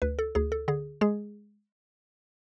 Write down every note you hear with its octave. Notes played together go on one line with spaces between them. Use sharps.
D2 B4
A4
D2 G#4
A4
D3 G#4
G#3 G#4